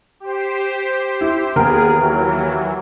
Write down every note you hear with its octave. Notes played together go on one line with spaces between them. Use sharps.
G4 C5
E4
D#2 B3 G#4 A#4 G5
E3 F#3